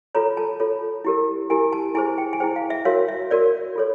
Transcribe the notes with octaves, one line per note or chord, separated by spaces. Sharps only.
F4 A4 C#5 A#5
A5
F4 A4 C#5
E4 G4 A#4
E4 G4 A#4 G#5
A5
E4 G#4 C5 G#5
G5
G#5
E4 G#4 C5 G5
F5
E5
F#4 A#4 C#5 F5
E5
F#4 A#4 C#5 D5
F4 A4 C#5